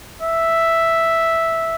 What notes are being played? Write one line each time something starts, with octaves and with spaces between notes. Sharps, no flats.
E5